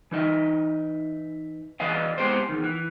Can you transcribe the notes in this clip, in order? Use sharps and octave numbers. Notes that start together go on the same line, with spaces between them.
E3 D#4 D#5 E5
E3 B4 D5 D#5 F5
G#3 B3 G4 C5
E2 D#3
E3